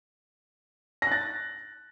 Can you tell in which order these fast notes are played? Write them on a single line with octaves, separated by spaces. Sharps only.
A#6 F#6 A6